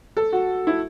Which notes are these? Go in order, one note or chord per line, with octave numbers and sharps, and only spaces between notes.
A4
F#4
E4